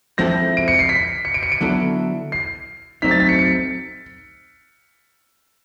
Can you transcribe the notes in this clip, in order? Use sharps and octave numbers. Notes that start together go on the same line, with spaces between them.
F3 G#3 C4 E4 A4 A#6
D7
C#7
C7
B6
C#7
D7
C#7
D7
D3 F#3 B3 E4 A4
C7
F#3 A3 C4 D#4 B6
A6
B6
C#7
C#7